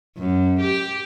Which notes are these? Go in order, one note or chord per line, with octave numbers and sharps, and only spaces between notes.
F#2
G4